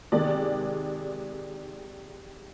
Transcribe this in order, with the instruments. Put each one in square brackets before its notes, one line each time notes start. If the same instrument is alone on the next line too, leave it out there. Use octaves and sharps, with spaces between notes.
[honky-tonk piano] C3 D#3 G#3 D5